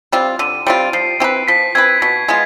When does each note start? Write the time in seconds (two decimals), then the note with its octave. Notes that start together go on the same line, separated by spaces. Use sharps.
0.12 G3 C4 F4
0.39 D3 D#7
0.66 G3 C4 F4 D7
0.93 F3 C7
1.20 C4 G4 B4
1.48 F3 B6
1.75 C4 G4 B4 G#6
2.01 B2 B6
2.28 G#3 B3 F4